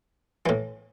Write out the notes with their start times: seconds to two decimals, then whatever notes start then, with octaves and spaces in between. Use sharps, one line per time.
0.46 A2 E3